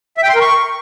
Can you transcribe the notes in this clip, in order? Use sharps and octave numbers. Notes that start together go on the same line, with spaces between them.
E5
G5
C6
A#4
C#6